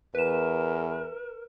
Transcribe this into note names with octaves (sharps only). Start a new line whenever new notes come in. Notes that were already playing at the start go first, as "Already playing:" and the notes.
E2 A#4 B4 E7